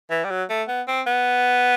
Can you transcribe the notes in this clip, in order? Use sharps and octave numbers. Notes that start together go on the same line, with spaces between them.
E3
G3
F#3
A3
B3
C4
B3